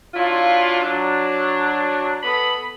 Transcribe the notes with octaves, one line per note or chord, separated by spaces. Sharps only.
F#3 D4 E4 F4
F#3 D4
B3 A4 D#5 B5